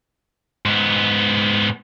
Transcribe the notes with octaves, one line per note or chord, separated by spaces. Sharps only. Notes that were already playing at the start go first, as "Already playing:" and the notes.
G#2 B3